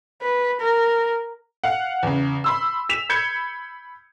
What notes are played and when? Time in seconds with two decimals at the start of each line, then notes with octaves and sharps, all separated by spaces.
0.22 B4
0.61 A#4
1.64 F5 F#5
2.03 E2 C#3
2.44 B5 C6 E6
2.89 B6 E7 F7
3.09 B5 G6 G#6 C#7